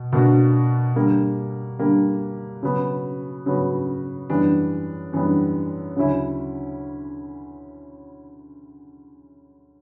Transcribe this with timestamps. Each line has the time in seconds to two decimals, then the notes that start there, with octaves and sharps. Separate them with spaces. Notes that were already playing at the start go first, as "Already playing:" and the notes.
Already playing: B2
0.12 B2 A#3 D4 F#4
0.96 D3 G3 A#3
1.79 D3 G3 A#3
2.63 C#3 F#3 B3 F#4
3.46 C#3 F#3 B3 F#4
4.29 F#2 E3 G3 B3 D4
5.13 F#2 E3 G3 B3 D4
5.96 D2 C#3 F#3 C#4 E4